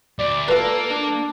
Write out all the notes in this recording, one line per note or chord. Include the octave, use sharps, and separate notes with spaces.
D2 D5
A#3 F4 A4 B4
D4